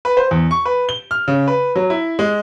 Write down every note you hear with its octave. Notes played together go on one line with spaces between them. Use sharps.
B4
C5
E2
C#6
B4
G7
F6
C#3
B4
F#3
E4
G#3